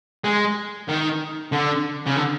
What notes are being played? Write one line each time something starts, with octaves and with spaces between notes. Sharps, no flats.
G#3
D#3
D3
C#3
D3